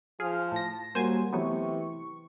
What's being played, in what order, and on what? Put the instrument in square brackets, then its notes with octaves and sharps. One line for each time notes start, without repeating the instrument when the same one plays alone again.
[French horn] F3 [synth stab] G#4 [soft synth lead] F6
[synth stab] A2 A#6 [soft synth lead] A5
[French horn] F#3 [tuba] G3 [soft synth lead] A#3 [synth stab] C5 G#5
[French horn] C3 [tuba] E3 [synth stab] F#3 A3 B3 [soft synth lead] C#6